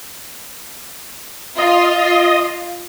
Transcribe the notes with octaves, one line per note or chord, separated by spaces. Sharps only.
F4 D#5